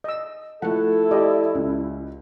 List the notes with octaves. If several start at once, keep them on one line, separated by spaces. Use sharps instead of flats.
D#5 E6
F3 A3 E4 A4 F#5
G4 D5 D#5
C#2